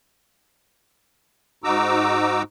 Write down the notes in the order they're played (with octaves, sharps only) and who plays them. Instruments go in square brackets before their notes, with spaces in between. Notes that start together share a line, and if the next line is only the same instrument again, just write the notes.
[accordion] G#2 D#4 F#4 A#5 D6 E6